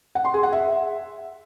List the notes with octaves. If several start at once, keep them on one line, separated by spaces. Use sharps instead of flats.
F#5
C6
G#4
F#5
E5